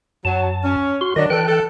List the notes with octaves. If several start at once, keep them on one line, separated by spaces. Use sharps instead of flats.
F#2 F#3 A5
C#4
F#4 C6
D#3 F#3 D4 D#5
E3 A4 G5 F#6
A4